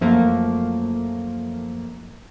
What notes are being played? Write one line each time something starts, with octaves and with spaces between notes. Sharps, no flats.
F#2 F3 A3 A#3